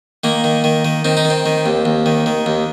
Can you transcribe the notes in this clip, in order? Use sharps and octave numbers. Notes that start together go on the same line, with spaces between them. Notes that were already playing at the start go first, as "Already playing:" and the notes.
D#3 A#3
D#3
D#3
D#3
D#3 C4
D#4
D#3
C4
D#3
D#2
D#2
D#3
D#3
D#2